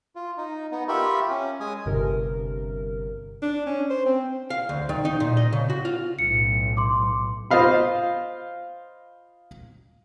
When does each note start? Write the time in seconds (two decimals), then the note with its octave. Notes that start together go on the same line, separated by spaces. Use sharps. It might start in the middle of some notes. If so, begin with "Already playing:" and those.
0.16 F4
0.38 D#4
0.71 B3 D#4
0.88 F4 G4 A#4 E5 B5 C#6
1.30 C#4
1.60 G#3 G#5 D#6
1.85 G1 G2 C3 A#4
3.42 D4
3.66 C#4
3.90 C5
4.05 C4
4.50 F5
4.69 D2
4.89 D#3
5.05 D#4
5.20 A#2
5.37 D#5
5.52 C#3
5.70 F#4
5.85 F4
6.19 B1 A2 C#7
6.77 C6 D6
7.51 F4 C5 D#5 F5 B5